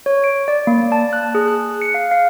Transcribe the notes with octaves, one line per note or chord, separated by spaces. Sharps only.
C#5
D7
D5
A#3
A5
F#6
G#4
F#6
C#7
F5
F5